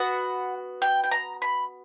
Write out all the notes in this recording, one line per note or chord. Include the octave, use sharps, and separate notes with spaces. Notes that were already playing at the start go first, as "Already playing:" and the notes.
Already playing: B3 F#4 F#5
G5
G5
A#5
B5